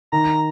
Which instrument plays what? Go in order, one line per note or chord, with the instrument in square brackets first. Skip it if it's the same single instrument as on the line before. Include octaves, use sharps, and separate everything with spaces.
[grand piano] D#3 [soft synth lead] A#5